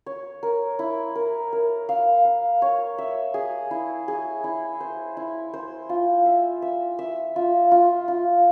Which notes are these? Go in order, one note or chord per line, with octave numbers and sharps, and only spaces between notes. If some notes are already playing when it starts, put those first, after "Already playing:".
C#5
A#4
E4
A#4
A#4
F5
F5
C#5
E5
G#4
E4
G#4
E4
C5
E4
C5
F4
E5
E5
E5
F4
F4
F4